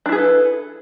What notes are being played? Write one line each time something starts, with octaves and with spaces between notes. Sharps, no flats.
D4 E4 G#4 A4 B4